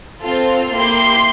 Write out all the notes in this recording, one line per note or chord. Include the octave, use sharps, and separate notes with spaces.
C4 F4 A4
A#3 E4 G4 C6